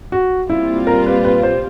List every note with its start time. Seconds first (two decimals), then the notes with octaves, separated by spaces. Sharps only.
0.12 F#4
0.50 A#2 G3 C4 E4 F4
0.87 A#4
1.06 B4
1.25 B4
1.43 C5